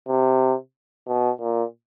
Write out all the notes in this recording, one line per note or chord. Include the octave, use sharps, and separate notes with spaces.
C3
B2
A#2